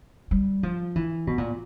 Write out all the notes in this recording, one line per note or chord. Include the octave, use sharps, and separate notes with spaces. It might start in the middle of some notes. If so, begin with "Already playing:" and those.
G3
F3
E3
B2
A#2